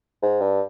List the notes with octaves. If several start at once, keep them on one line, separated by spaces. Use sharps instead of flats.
G#2
G2